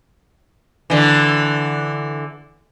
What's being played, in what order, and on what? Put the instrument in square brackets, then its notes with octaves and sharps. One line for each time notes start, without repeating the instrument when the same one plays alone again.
[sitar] D3 E3